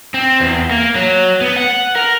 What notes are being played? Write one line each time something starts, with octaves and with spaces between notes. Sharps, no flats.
C4
E2
A#3
F#3
B3
F#5
A#4